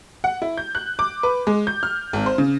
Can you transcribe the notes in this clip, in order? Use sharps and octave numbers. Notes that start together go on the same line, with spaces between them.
F#5
E4
G6
F#6
D6
B4
G#3
G6
F6
G#1
C5
C#3